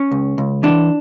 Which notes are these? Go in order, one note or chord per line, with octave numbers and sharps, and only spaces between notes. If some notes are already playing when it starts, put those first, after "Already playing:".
Already playing: C#4
C#2
C#2
E3 D4